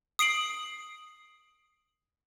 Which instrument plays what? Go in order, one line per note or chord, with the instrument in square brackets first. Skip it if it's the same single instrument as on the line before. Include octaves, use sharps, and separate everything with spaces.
[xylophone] D#6 C7 D7 F#7